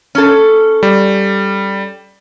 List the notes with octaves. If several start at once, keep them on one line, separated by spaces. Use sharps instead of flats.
C#4 A4
G3